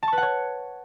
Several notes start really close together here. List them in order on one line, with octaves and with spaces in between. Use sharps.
A5 C#6 B4 F#5 C#5